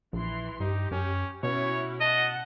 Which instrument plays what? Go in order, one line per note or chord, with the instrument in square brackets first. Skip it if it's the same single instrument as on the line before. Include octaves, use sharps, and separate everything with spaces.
[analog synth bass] A#1 [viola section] E3 C6
[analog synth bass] G2 [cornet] D#4 [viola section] G4
[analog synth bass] F#2 [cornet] C#4
[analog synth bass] B2 [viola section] C#4 E4 F#4 [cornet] C#5
[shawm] D#5 [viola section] F#5 [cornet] A5